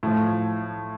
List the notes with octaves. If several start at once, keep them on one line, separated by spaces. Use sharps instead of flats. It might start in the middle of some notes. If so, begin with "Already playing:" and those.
A2 F3